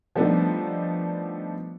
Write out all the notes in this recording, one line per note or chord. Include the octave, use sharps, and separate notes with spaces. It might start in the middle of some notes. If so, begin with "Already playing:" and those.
F3 G3 A3 B3 D4 D#4